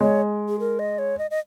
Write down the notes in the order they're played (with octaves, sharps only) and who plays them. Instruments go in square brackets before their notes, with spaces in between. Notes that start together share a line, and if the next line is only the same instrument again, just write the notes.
[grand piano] G#3 [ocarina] C#5
[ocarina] G#4
A#4
D#5
C#5
D#5
D#5